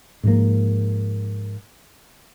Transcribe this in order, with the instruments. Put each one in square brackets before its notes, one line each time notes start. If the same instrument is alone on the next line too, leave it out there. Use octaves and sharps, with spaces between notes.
[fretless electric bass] G#2 F3 A#3